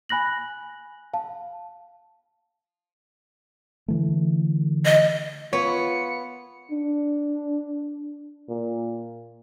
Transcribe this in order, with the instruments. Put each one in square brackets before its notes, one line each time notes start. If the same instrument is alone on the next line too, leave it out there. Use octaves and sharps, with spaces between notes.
[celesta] G#5 B5 F#6 A#6 F#7
F5 A5
[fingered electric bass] D3 E3 A3
[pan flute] D#5
[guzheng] B3 [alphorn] F4 [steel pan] C#5 [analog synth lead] C#7
[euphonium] D4
A#2